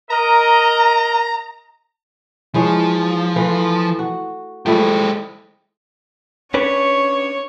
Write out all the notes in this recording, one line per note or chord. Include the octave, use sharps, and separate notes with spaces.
A#4 D#5 A#5
E3 F3 G#3 C#5
E3 A3
F#4
F3 G#3 A3 E4 G4
C#4 D4 B4 C#5 C#6